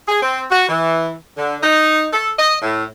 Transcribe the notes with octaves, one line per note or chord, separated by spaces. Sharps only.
G#4
C4
F#4
E3
D3
D#4
A4
D#5
A2